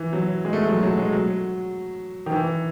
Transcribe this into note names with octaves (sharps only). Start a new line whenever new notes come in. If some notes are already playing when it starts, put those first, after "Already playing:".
Already playing: E3
F#3
G#3
A3
F#3
F#3
G#3
F#3
D#3
E3